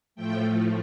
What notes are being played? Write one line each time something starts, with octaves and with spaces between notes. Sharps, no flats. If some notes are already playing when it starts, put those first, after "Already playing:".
A2 F3 A3 G5